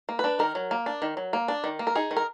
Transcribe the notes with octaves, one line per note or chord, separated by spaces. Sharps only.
A#3
D4 B4
D#3 A#4
F#3
A#3
D4
D#3
F#3
A#3
D4
D#3
A#3
A#4
D#4 G#4
D#3
A#4